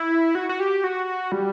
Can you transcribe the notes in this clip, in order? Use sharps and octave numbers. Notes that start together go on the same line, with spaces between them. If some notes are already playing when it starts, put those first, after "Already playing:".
Already playing: E4
F#4
F#4
G4
F#4
G3